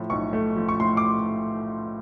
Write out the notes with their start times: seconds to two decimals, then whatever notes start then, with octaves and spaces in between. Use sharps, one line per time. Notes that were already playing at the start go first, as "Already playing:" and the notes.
Already playing: A2 F3 A3
0.10 B1 C#6
0.33 A3
0.56 F3
0.69 C#6
0.80 A2 C6
0.97 D6